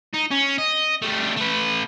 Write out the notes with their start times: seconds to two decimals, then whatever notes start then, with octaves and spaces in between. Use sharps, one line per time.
0.13 D#4
0.31 C#4
0.58 D#5
1.02 G3 A3
1.37 A3 B4